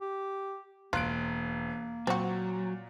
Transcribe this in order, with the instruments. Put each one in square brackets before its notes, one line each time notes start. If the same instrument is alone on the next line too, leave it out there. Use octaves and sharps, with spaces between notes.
[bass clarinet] G4
[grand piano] E1 F#6 D7 [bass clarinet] A#3 [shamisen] F4
[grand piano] A#2 [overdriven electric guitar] F#3 [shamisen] C4 F#4